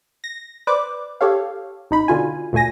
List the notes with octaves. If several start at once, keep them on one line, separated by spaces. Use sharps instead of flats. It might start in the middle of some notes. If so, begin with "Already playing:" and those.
A#6
B4 C5 D5 D6
G4 A4 C#5 F5
A1 D#4 B5
B2 D3 F4 G#5
D2 A#2 A3 G#5 A#6